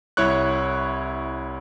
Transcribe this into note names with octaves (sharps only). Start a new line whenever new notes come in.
C2 E4 C#5 C#6 F#6